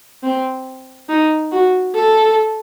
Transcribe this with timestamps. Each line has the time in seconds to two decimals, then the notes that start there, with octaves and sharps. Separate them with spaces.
0.23 C4
1.09 D#4
1.52 F#4
1.94 A4